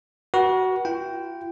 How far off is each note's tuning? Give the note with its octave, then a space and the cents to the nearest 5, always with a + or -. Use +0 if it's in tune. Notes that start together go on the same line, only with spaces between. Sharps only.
F#4 +15 B4 -40
F4 -45 G5 -5